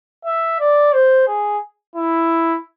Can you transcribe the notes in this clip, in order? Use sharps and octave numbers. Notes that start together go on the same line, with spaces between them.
E5
D5
C5
G#4
E4